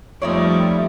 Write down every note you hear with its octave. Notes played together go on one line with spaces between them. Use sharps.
F2 F3 G3 A3 D#4 E4 C#5 D5